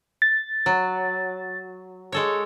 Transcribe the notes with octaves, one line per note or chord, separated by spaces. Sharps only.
A6
F#3
G#3 A4 C#5